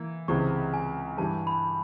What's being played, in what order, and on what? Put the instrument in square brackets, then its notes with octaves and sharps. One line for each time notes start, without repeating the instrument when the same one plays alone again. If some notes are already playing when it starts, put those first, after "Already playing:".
Already playing: [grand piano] E3 A#3
[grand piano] C#2 C3 E3 G#3 [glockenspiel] C#6
[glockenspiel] G#5
[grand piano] G2 E3 G3 [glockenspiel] A5
[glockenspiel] B5